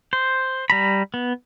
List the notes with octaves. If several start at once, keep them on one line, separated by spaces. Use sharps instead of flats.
C5
G3 A#5 B5
B3